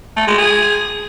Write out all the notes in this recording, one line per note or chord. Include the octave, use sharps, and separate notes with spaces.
A3
G#3
G#4